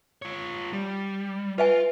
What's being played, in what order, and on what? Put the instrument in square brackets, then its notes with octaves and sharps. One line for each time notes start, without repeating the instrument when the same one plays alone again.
[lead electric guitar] F4 C#5
G3
[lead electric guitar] F4 [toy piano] B4 E5 G#5